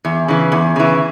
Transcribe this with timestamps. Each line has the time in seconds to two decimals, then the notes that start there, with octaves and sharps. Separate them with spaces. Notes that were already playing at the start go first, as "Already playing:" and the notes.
0.05 E2
0.28 C#3 E3
0.52 E2
0.76 C#3 E3